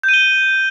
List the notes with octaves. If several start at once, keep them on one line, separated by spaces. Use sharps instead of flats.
G6
D#7
G7